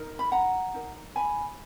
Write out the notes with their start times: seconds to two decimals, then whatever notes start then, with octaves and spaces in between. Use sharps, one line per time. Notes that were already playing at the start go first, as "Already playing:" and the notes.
Already playing: D#4 A#4
0.19 B5
0.32 F#5 A#5
0.74 D#4 A#4
1.16 G#5 B5